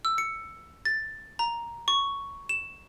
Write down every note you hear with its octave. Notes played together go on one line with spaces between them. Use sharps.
E6
C#7
A6
A#5
C#6
E7